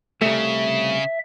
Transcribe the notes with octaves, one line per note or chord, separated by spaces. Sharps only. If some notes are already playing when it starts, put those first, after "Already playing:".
C2 C#3 A3 E5